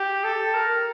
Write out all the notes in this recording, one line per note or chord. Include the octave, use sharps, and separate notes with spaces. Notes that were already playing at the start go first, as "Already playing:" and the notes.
Already playing: G4
A4
A#4